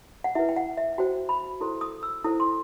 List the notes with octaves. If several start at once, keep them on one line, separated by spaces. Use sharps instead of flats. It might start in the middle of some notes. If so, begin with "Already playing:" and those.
F#5
E4 B4 E5
G5
F#5
E5
F#4 C5 G5
B5
E4 A4 C5 C6
D#6
E6
E4 A4 C5 D#6
C6